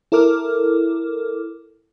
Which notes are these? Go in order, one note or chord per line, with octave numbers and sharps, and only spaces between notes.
E4 A4 A#4 D6 F6